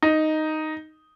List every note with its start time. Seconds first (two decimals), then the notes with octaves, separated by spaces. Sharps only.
0.02 D#4